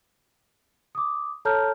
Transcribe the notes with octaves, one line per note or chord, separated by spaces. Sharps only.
D6 D#6
A4 C#5 A5 A#5 F6 G6